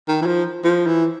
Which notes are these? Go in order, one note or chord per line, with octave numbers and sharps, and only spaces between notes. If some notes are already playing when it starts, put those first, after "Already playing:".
D#3
E3
F3
F3
E3